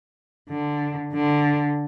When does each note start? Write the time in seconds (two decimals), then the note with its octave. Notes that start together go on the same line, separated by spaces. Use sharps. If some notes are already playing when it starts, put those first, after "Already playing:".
0.50 D3
1.14 D3